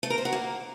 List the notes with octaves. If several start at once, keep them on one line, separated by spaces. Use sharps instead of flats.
A3
A#4
C5
F#4
A#3